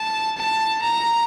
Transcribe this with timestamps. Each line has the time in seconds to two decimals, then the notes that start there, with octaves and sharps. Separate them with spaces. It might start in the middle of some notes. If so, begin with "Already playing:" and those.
Already playing: A5
0.38 A5
0.83 A#5